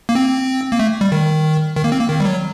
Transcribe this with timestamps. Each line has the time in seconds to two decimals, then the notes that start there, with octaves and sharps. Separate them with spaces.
0.09 A#3
0.15 C4
0.72 A#3
0.79 A3
1.01 G3
1.12 D#3
1.76 D#3
1.84 A#3
1.92 C4
2.01 A#3
2.09 D#3
2.20 G3
2.25 F#3